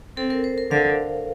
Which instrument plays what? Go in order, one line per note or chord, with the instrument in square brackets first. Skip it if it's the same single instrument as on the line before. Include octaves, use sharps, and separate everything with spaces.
[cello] C4 [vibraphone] A4
[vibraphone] A#4
C5
A#4
[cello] D3 [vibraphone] F5